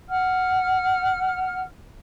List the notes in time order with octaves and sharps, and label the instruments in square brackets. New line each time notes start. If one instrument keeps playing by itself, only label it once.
[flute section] F#5 F6